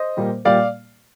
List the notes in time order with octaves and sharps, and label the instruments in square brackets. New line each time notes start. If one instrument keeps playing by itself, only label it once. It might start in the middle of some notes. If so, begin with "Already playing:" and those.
Already playing: [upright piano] C5 D#5
A#2 G3 A#3
A#2 G3 A#3 D5 F5